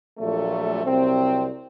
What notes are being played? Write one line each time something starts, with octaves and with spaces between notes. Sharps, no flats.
A#1 A#2 F#3 A3
C2 C3 F#3 C4